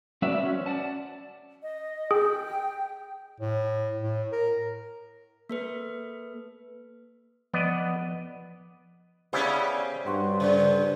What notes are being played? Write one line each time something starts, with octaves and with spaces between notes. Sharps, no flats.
F#3 C#4 F#4 B4 D5 E5
C#4 C5
D5 F#5 A5
D#5
G#4 G5
A2
A2
A#4
A#3 A4 B4
F3 B3 D5 D#5
C#3 B3 C#4 E4 G4 C5 D5
G2 F#4 C6
C#3 C5